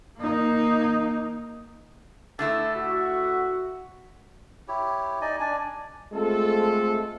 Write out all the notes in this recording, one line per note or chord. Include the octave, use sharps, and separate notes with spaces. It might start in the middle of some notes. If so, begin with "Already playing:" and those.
A#3 D#4
D3 A3 E4 A5
F#4 E5
E4 G4 C#5
D#4 D5 D#5 G#5
D4 D5 G#5
G#3 A3 C4 F4 A4